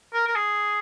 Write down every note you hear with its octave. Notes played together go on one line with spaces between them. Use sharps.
A#4
A#4
G#4